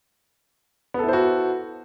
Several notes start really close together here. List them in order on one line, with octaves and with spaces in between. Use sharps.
B3 A4 E4 C5 F#4